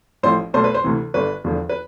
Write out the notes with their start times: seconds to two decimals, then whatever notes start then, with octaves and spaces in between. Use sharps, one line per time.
0.23 A1 A2 F3 C5
0.53 B1 B2 A3 C5
0.64 B4
0.74 C5
0.84 D2 C3 E3
1.14 G1 G2 D3 B4
1.44 E1 E2 D3 F3
1.69 B4